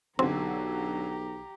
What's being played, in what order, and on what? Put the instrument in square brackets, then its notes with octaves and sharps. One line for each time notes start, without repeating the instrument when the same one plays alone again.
[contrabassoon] B1 [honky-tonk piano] D3 F#3 [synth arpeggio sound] C4 [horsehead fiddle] G4 A#5